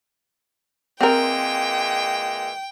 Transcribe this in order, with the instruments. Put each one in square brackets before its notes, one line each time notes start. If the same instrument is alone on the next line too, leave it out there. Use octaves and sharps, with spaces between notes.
[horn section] A#2 E3 G#3 [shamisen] C4 A#4 [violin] G5